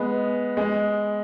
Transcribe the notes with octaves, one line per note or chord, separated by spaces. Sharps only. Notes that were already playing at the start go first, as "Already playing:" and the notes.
Already playing: G#3 B3
G#3